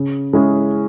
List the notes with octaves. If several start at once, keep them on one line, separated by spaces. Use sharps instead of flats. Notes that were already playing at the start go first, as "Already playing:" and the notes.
Already playing: C#3
G#3 C#4 E4 G#4